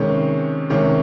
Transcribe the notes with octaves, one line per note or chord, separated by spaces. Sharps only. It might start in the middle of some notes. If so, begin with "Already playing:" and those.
Already playing: C3 D#3 G#3 C#4
C3 D#3 G#3 C#4